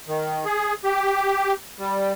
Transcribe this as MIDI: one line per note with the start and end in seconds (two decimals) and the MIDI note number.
0.07 0.45 51
0.45 0.74 68
0.84 1.53 67
1.79 2.13 55